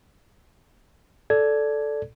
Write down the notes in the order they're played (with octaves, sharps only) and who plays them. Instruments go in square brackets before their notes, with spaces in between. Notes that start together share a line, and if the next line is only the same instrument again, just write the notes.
[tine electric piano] A4 D5 G#6